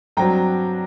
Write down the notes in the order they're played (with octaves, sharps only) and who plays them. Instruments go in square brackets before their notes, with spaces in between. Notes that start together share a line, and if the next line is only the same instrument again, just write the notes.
[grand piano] G2 F#3 C4 G5 A#5